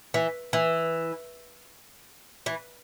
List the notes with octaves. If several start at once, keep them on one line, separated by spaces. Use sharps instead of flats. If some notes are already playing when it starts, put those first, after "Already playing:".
E3
E3
E3